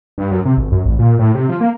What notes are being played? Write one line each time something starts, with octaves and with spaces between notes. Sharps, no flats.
G2
F#2
C3
G#1
F#2
A1
A#2
A2
C3
F3
A#3